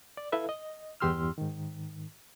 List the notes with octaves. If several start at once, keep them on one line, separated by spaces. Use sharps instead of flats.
D5
E4 A4 B4 E5 F5
D#5
E2 G2 G4 C6 E6 F6
G#2 D#3